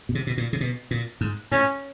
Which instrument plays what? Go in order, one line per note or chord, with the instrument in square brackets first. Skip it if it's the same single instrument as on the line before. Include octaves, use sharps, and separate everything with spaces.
[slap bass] B2
C3
B2
A#2
C3
B2
A#2
G#2
[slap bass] A2 [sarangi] C#4